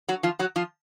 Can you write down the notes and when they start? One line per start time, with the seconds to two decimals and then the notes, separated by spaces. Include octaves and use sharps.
0.09 F#3 F#4
0.23 F3 F4
0.39 F#3 F#4
0.56 F3 F4